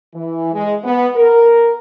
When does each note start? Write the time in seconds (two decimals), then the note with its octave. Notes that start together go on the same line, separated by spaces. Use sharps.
0.15 E3
0.54 G#3
0.84 B3
1.16 A#4